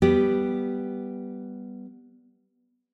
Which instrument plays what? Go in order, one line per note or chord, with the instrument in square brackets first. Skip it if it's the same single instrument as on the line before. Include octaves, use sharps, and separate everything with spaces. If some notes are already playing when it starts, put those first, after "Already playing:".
[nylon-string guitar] G3 B3 G4